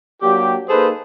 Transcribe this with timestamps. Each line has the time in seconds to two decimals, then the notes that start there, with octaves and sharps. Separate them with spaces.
0.22 F#3 A#3 D4 G4
0.69 A#3 D#4 G#4 A4 B4 C5